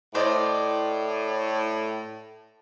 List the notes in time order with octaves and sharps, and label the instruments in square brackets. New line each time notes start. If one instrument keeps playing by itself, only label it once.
[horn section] A2 [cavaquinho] C5 D5 D#5